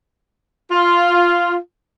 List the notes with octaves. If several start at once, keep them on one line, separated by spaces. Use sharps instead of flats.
F4